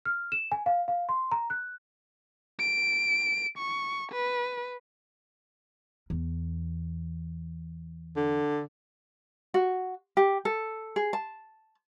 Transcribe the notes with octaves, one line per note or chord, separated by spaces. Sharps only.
F6
E7
G#5
F5
F5
C6
A#5
F#6
D7
C#6
B4
E2
D3
F#4
G4
A4
G#4
A5